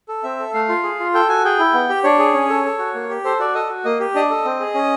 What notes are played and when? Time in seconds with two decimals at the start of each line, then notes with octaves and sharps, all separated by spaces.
0.09 A4
0.23 C4 E5
0.39 A4
0.54 A3 F5
0.69 F4
0.83 G#4
0.99 F4
1.14 A4 G5
1.29 F#4 G#5
1.45 G#4 G5
1.59 E4
1.74 B3
1.89 G4
2.04 D4 C#5
2.19 G#4
2.34 C#4
2.49 A4
2.65 A4
2.79 F#4
2.94 A#3
3.10 G4
3.24 A4 C5
3.39 F#4 D5
3.55 A4 D#5
3.69 F#4
3.85 A#3 D#5
4.00 G4
4.15 D4 D#5
4.30 A4
4.45 C4
4.60 G#4
4.74 C#4